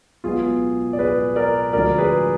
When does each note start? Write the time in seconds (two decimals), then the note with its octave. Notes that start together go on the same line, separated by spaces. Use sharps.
0.24 B1 B2 G#3 B3 F4 G#4
0.93 D5
0.99 G#4 B4
1.36 A#4 D5
1.73 D2 D3 F3 G#3 A#4 D5
1.98 G#4 B4